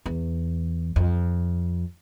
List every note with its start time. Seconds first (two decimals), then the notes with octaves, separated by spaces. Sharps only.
0.06 E2
0.96 F2